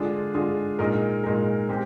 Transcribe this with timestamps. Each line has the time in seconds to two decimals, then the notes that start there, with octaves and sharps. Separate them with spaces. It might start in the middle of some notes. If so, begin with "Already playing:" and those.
Already playing: D3 G#3 D4 F4 G#4
0.34 D3 G#3 D4 F4 G#4
0.79 A#2 G#3 D#4 A#4
1.24 A#2 G#3 D#4 A#4
1.69 G#3 C4 G4